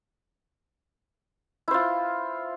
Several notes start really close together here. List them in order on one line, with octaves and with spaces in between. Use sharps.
E4 C5 F4